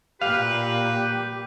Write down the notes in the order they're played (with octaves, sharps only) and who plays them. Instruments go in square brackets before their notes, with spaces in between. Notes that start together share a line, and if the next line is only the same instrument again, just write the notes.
[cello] A#2 [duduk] G4 [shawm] B4 [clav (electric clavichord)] F5